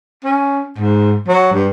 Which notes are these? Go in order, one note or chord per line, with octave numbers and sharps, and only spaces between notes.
C#4
G#2
F#3
G2